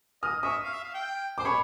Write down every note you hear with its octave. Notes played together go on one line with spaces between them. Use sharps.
D#5 D#6 F6
E5 C#6 D#6
F5
E5
F5
G5
C5 D6
C#5 B5 C#6